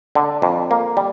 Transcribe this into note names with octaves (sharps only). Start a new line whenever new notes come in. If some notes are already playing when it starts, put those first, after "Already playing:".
D3
F2
A#3
G3